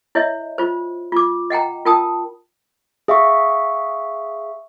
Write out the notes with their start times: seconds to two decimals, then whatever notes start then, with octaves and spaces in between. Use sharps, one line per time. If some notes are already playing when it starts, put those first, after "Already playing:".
0.15 E4 C#5 D#5 E5
0.58 F4 C5
1.12 F4 D6
1.50 D#5 F#5 G5 A#5
1.85 F4 A#4 G5 A5 D#6
3.08 G#4 E5 F5 C#6